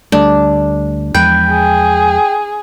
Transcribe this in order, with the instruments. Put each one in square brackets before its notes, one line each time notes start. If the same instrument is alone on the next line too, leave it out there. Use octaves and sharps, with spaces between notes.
[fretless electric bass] D2 G3 A3 [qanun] D4
[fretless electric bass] E2 F3 G#3 [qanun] B4 [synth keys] G5
[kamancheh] G#4